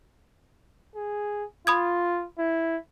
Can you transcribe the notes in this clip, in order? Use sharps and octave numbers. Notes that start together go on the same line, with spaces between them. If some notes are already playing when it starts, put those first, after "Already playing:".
G#4
F4 B5 D#6 G#6
E4